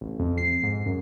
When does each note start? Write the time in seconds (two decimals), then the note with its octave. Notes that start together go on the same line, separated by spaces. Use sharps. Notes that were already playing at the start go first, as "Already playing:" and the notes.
0.01 A1
0.19 F2
0.38 C7
0.63 G#2
0.86 F#2